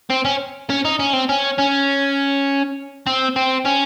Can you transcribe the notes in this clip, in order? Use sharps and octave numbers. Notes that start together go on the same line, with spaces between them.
C4
C#4
C#4
D#4
C#4
C4
C#4
C#4
C4
C4
C#4